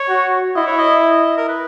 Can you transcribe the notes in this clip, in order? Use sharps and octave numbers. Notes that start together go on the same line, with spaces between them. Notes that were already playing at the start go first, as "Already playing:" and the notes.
Already playing: C#5
F#4
E4 D#5
C#5
D#5
D#5
A#4
B4